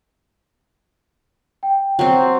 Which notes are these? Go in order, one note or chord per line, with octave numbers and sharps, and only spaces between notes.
G5
F#3 C4